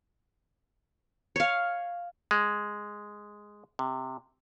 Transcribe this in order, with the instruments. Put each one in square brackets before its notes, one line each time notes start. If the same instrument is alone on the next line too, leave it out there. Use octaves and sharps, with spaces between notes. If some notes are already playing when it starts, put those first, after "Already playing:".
[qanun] C#5 F5
[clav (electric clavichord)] G#3
C3